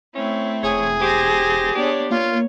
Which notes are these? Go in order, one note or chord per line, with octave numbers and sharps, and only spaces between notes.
A3 C4 C#4 E4
E1 G#4 C#5
G4 C5 A#6
B3 D4 G4 C#5
A#3 F4 C#5